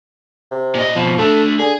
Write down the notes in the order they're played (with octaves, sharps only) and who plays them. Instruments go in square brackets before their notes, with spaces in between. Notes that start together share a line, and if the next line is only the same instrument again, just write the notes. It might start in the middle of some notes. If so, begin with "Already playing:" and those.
[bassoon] C3
[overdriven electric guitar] A#2 D#5
[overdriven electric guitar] F2 B2 [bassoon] F3
[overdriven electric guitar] D3 A3 [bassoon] A4
[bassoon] D3 [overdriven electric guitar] G#4